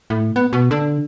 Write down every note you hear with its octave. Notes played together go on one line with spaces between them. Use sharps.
A2
B3
B2
D3